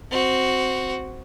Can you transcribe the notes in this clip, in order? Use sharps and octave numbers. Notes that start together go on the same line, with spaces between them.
C4 F#4